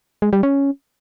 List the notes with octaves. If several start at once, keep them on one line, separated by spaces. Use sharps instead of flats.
G#3
G3
C#4